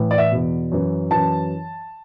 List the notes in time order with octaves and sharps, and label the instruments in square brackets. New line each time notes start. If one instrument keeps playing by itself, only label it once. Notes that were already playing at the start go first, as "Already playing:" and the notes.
Already playing: [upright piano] A2 E3
D5
E5
E2 B2
F#2 E3
F#2 E3 A5